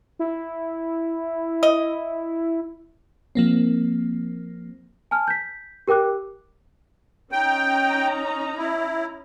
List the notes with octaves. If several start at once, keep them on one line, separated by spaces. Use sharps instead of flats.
E4
D#5
F3 A#3 C4
G#5 A5 F6
G6 B6
G4 A#4 G5 D6 F#6
C#4 D#4 G5 A#5
E4